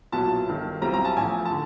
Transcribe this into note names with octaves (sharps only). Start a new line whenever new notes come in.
B1 A#2 F#3 B3 E4 A5
G1 G2 D#3
B1 B2 G3 C4 E4 A#5
A#5
A5
A1 A2 F3 G#5
A5
D3